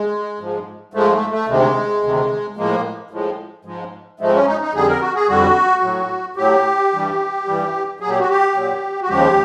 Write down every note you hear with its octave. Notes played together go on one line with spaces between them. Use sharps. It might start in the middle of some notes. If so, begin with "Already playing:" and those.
Already playing: G#3
G#2 F3 G#3
G#2 F3 G#3 A3
A3
A3
D2 C3 D#3 G#3
D2 C3 D#3
A2 F3 G#3 A#3
A2 F3 G#3
G#2 F3 G#3
G#2 F3 G#3 A3
C4
C#4
D#4
D#4
F2 D3 G3 G#4
A#4
F#4
G#4
F2 D3 G3 F#4
A2 F#3
A2 F#3 G4
G2 E3 G3
G2 E3 G3
A#2 F#3 G#4
G4
F#4
G4
A#2 F#3
F#4
D#2 C#3 F3 G#3 G4